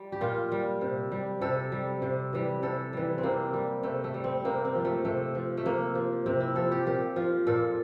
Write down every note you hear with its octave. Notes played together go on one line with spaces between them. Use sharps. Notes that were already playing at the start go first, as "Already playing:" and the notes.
Already playing: G3
G4
A#2 F4
G3
C3
G3
C3 A4
G3
C3
E3 G3
C3 A4
E3 G3
C4
C3 A#3
G3
C3 A3
A3
G3
C4
C3 A#3
C4
F3
A3
C3 A3
F3
A3
C3 A#3
F3
C3 C4
E4
F3 A4
G4
A#2 G4
F3 F4
A#2 A4